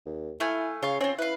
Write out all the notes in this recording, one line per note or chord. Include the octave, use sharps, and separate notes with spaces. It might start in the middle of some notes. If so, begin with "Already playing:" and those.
D#2
A3 E4 F5 G#5
C#3 F4 C#5 F5
C4 C#4 F4
E4 B4 F5